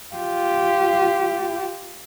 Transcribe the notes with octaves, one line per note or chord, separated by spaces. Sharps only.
F4 G4